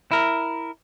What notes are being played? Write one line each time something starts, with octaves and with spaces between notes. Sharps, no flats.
E4 A#4